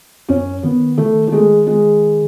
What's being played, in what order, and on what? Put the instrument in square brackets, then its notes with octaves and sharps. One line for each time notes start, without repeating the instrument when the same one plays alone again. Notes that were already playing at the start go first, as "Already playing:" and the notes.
[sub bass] F#2 [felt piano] C#4
[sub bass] D#3 [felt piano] B3
[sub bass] D#3 [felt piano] A3
[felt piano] A3
G#3
G#3